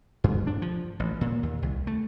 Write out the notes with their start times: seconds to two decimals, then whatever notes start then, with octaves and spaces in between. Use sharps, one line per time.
0.24 G2
0.47 D4
0.62 F3
1.00 A1
1.21 A#2
1.43 D#2
1.62 C2
1.87 A3